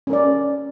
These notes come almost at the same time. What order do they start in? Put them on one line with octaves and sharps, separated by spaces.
C#4 A#4 D5